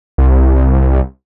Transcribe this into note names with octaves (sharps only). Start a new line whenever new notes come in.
C2